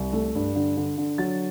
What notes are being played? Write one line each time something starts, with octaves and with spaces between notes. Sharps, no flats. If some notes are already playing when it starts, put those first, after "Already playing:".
Already playing: C2
A3
G2
D3
D3
D3
F#3 A6